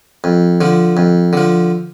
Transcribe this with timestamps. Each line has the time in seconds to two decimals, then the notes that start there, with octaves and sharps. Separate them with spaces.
0.24 F2
0.61 D3 F3
0.97 F2
1.33 D3 F3